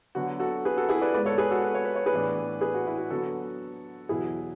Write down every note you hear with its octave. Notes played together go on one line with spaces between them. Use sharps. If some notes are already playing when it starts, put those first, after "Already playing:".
D3 F#3 B3 F#4
F#4 A4
G#4 B4
F#4 A4
E4 G#4
B4 D5
G#2 G#3 B3 B4 D5
A4 C#5
G#4 B4
F#4 A4
B4
C#5
B4
C#5
G#4 B4
A2 E3 B3 D4
G#4 B4
F#4
E4
F#4
D3 F#3 B3 F#4 A4
E2 B2 F#3 E4 G#4